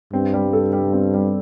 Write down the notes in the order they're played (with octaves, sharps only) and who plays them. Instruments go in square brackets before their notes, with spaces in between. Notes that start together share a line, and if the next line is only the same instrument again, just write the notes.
[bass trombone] G2 [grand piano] C4
[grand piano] G3
A4
G3
C4
G3